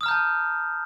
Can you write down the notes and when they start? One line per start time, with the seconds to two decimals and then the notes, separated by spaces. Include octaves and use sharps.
0.01 D#6
0.03 F6
0.06 A#5
0.08 G6
0.11 A5